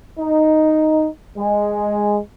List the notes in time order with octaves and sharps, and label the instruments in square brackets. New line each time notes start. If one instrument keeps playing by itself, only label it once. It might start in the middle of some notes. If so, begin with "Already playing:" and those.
[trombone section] D#4
G#3